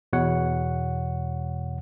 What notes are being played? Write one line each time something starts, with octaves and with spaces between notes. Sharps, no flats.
E2 B2 C#5 F#5